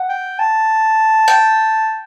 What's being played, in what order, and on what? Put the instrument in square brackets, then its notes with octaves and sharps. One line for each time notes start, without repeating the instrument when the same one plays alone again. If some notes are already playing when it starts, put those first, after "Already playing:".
Already playing: [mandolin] F#5
[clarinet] G5
A5
[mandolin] G5